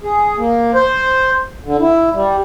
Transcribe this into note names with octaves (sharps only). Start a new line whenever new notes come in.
G#4
A#3
C5
D3
E4
G3